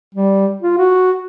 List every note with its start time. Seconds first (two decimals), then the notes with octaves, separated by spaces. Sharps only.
0.15 G3
0.62 F4
0.77 F#4